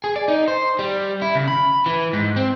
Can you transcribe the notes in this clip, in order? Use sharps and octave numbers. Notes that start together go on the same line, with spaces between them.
G#4
D5
D#4
C5
G3
E4
C#3
B5
E3
G#2
C4